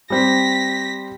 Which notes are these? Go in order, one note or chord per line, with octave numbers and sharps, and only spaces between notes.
G3 C4 A#6 B6